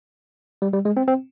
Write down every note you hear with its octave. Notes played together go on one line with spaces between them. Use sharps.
G3
G3
G#3
C4
C4